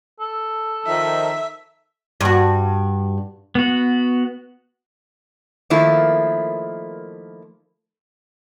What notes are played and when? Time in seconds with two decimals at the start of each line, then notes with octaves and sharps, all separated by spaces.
0.20 A4
0.87 D#3 F3 D#4 E5
2.21 G2 F#4
3.55 B3 F#4
5.70 D#3 F3 A3 A#3 E4